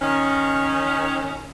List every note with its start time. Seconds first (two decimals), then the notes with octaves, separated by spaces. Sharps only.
0.02 D#3 C#4